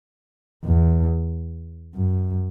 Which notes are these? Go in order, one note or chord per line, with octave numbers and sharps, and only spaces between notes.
E2
F#2